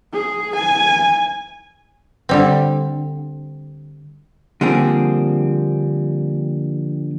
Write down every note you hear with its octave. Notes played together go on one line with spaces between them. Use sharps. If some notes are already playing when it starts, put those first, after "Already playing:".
G#4
G#5
D3 G3 C4
D3 F3 G3 A#3 C4 G#4